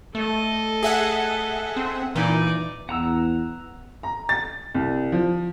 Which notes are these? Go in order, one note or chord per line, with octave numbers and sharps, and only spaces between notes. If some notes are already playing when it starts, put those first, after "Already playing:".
A3 A4 D#5
G#4 E5 F#5
C4
A#2 E3 D#4 D5
E2 F#5 A#5 E6
A#5
A6
C2
F3